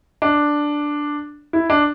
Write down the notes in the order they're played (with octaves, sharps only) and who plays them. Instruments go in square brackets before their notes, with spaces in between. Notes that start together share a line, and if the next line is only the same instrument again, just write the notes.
[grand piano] D4
E4
D4